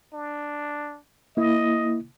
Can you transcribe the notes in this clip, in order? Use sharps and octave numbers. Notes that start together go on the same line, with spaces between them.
D4
A#3 E4 D#5